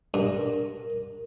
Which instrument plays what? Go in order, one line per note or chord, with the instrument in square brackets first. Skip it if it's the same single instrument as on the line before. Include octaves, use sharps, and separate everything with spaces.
[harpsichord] G2 [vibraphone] A#4